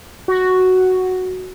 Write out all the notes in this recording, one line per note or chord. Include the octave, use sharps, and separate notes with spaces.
F#4